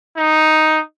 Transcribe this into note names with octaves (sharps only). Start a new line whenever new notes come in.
D#4